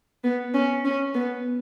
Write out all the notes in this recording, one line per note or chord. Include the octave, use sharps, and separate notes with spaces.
B3
C#4
C#4
B3